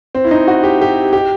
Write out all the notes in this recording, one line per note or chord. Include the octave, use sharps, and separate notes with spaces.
C4
E4
D#4
F#4
G4
G4
G4